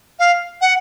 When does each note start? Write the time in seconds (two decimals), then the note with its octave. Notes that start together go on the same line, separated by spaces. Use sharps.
0.19 F5
0.61 F#5